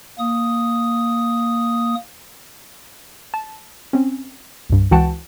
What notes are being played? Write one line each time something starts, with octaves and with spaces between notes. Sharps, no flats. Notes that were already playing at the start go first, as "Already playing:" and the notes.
A#3 D#6
A5
C4 C#4
C2 G2
C#2 E3 F#4 F#5 G5 A5